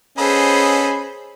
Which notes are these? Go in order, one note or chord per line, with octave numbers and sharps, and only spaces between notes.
B3 C#4 G#4 A4 C5 D#5 B5